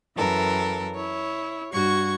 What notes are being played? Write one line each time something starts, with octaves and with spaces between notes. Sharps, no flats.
F#2 E3 A4 A#4
E4 C#5
G2 F#4 C#6 G#6